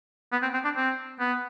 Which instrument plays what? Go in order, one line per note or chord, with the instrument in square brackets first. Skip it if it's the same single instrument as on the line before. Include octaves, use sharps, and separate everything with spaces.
[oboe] B3
C4
C4
D4
C4
B3